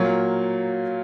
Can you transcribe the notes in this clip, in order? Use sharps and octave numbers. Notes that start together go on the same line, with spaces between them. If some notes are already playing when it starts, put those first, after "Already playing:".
Already playing: A#2 F#3 A#3